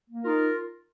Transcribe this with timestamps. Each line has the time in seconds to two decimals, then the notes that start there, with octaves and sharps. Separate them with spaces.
0.09 A#3
0.24 D#4 F4 A#4